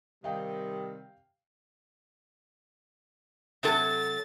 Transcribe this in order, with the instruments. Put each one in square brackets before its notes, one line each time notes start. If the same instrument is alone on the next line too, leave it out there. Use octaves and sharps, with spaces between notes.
[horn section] C3 D#3 [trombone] G3 [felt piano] F5 G5
[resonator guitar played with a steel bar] C3 F#3 A4 [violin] A6